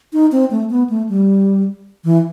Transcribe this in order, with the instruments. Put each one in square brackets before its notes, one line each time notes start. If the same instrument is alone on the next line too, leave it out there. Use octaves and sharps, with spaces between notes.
[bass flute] D#4
C4
A3
B3
A3
G3
E3